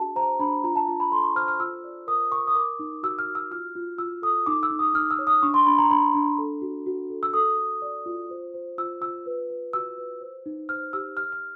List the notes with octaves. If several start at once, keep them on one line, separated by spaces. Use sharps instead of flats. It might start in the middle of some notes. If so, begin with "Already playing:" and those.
Already playing: D4 F#4 G#4 A5
C5 A#5
D4 B5
F4 A#5
A5
F4 A5
B5
A4 C6
C#6
C5 F6
F6
F4 E6
D5
A#4 D#6
A#4 C#6
D#6
A#4 D6
D#4
F#4 E6
F6
F#4
E6
F4 F6
F4
F4 E6
A4 D#6
D#4 D6
E6
D#4
D#6
D#4 F6
E6
C#5
D#6
D4 C#6
C6
D4 B5
A#5
D4 B5
D4
A4
F#4
F#4
A4
E6
A4 D#6
A4
D5
F4
C5
C5
F4 E6
F4 E6
B4
B4
F#4 E6
B4
C5
D#4
C5 F6
G4 E6
G4 F6
F6